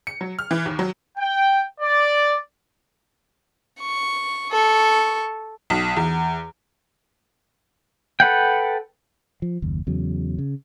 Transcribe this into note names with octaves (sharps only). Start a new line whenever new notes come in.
C#7
F#3
F6
E3
D#2
F#3
G5
D5
C#6
A4 C#6
B1
E2
A4 B4 F#5 G5
F3
F#1 D#2
E2 C#3 F#3
C#3